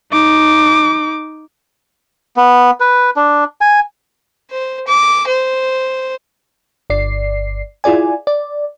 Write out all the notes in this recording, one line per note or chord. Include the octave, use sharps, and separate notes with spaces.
D#4 D6
B3
B4
D4
G#5
C5
D6
C5
G1 D5 C7
E4 F4 G#4 D5 G#5
D5